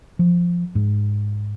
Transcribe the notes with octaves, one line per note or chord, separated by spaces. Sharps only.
F3
G#2